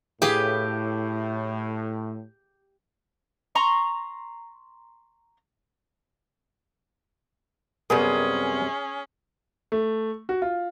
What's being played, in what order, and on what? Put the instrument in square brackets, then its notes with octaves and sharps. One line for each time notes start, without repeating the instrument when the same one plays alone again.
[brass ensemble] A2 [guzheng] G4 [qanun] G#4 B4 F5
[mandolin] A#5 C6 C#6
[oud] F#2 C3 G3 [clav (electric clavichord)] B3 A#4 [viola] C#4 [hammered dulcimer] G#4
[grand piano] A3
F#4
F4